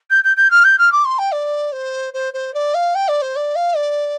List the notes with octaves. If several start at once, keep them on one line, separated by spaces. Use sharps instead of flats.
G6
G6
G6
F6
G6
F6
D6
C6
G5
D5
C5
C5
C5
D5
F5
G5
D5
C5
D5
F5
D5